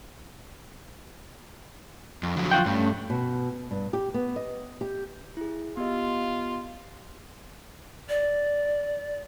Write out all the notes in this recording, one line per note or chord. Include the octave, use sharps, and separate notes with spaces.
F2
D3 F3 F#3
F4 F#4 G5
G2 A3 C#4
B2
G2
G4
B3
D#5
G4
E4 G#4
B3 F4 G4 D#5
D5